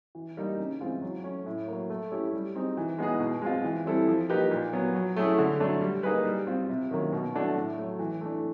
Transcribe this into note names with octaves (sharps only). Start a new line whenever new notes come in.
E3
G3 A#3 D#4
C#3
E3 G#3 C4 F4
F#3
A3 C#4
A2
F#3 A#3
A3
C#4 E4 G4
G3
C4 D#4 G#4
E3
G#3 B3 D#4 G#4
B2
G#3 C4 F4
E3
G3 C4 E4 A4
F3
A#3 D#4 G4 B4
A#2
F#3 B3
F#3
A3 C#4 E4 G#4
D3
F#3 A3 D4
G3
A#3 D#4 G#4 B4
G3
C4 F4
C3
D#3 F#3 A#3 C#4
B2
F#3 A3 D4 F#4
A2
F#3 A3
E3
A3 D4